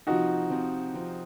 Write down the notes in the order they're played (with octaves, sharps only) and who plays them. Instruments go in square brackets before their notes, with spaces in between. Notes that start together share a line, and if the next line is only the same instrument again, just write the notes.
[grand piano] C3 F3 C4 F4 [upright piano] D#4 F#4
[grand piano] C3 F3 C4 F4
C3 F3 C4 F4